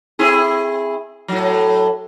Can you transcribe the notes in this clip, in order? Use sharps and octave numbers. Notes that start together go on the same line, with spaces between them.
C4 E4 G#4
A2 F#3